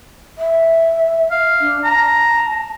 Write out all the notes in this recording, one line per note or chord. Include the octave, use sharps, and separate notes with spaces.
E5
F5
D4
A5 A#5